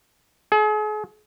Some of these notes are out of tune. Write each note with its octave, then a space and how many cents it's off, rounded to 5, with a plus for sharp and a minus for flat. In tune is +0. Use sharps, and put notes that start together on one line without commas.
G#4 +40